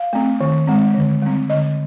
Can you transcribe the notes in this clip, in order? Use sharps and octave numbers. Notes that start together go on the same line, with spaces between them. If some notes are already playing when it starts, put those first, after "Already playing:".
Already playing: F5
A3 C4
D#3
G#3 C4
D3
G3 C4
D3 D#5